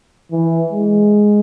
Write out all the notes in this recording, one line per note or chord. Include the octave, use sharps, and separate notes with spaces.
E3
G#3